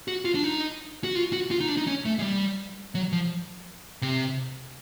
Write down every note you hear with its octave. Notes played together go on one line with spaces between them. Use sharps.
F#4
F4
D4
D#4
F#4
F4
F#4
F4
D#4
D4
D#4
C#4
A3
G#3
G3
F#3
F3
C3